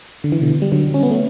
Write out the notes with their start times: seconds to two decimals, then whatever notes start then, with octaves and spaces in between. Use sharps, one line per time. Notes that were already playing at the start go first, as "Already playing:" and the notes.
0.24 D3
0.32 E3
0.41 B2 D3
0.62 G3
0.72 D3 F#3
0.94 C#4
1.03 B3
1.11 A3